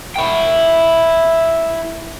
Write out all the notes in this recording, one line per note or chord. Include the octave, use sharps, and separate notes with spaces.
E4 G5